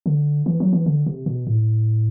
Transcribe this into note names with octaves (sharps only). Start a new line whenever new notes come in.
D3
E3
F#3
E3
D3
C3
B2
A2